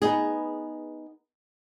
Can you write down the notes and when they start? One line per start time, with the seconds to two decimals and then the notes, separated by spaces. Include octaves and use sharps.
0.02 B3 D#4 G#4